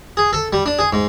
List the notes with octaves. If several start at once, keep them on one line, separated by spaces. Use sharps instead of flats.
G#4
A4
G3
D4
G#4
G#2